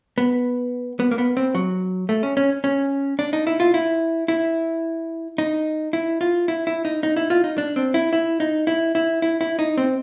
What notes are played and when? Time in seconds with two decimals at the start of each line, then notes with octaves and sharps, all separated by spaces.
0.18 B3
1.00 B3
1.11 A#3
1.18 B3
1.37 C4
1.55 F#3
2.09 A3
2.23 C#4
2.37 C#4
2.64 C#4
3.19 D4
3.33 D#4
3.47 E4
3.60 F4
3.74 E4
4.28 E4
5.38 D#4
5.93 E4
6.21 F4
6.48 E4
6.67 E4
6.85 D#4
7.03 D#4
7.16 E4
7.30 F4
7.44 D#4
7.58 D4
7.76 C4
7.94 E4
8.13 E4
8.40 D#4
8.67 E4
8.95 E4
9.22 E4
9.41 E4
9.59 D#4
9.78 C4